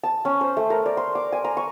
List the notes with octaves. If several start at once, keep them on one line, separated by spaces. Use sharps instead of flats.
A5
C#4
C5
A3
A#4
D5
C6
D6
G#5
A#5
C#6